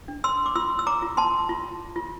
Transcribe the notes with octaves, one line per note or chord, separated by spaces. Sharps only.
D4
C6 E6
D6
F4 C6 E6
E6
A#5 D6
F4
A5 C6
F4
F4